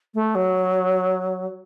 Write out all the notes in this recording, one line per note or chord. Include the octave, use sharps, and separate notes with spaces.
A3
F#3